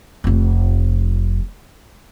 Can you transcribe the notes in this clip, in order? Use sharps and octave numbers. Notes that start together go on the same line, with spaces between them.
F1 F2